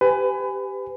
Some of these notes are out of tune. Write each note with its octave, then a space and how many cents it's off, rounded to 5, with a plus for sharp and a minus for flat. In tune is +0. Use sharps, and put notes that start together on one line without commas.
G4 +0 B4 +30 G#5 +0